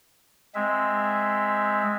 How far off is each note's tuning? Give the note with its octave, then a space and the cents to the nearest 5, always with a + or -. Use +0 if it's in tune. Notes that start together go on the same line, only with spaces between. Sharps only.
G#3 +0 C4 +0 E5 +0